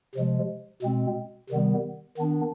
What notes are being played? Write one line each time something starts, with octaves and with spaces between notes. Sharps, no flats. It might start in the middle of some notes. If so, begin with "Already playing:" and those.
C3 F3 G#3
B2 G#3 C4
C3 D#3 G3 B3
D#3 B3 D4